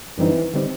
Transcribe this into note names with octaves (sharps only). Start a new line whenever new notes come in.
F#2 D3 E3 G3 C4 D#4
D3 G3 C4 D#4